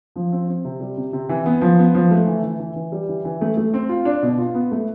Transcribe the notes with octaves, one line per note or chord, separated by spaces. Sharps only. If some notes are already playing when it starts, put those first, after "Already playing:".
F3
C4
C4
C3
G3
C3
C3
E3
B3
F3
B3
F3
A3
E3
E3
E3
E3
G3
E3
E3
A3
A3
C4
F4
D4
B2
F4
B3
A3